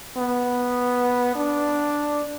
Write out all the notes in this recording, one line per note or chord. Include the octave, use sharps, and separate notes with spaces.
B3
D4